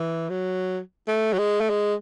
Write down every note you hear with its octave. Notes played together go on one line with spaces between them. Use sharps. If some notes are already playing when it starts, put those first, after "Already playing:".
Already playing: E3
F#3
A3
F#3
G#3
A3
G#3